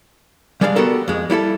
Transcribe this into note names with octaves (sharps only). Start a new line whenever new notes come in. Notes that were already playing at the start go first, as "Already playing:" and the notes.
G3 G#3 D4 D5 E5 F5
B3 F#4 G4 A4 A#4
F2 G#3
G3 E4 F#4 A4